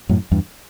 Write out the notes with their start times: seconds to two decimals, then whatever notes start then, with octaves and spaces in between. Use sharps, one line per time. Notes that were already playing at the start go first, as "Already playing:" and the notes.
0.09 F#2 A2
0.31 E2 G2